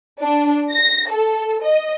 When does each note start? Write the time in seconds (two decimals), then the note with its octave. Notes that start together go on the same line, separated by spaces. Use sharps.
0.22 D4
0.72 A#6
1.10 A4
1.64 D#5